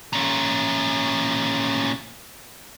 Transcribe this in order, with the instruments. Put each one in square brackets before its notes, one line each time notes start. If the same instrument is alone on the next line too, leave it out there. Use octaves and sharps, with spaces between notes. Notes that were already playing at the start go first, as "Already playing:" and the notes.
[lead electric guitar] A#2 C#4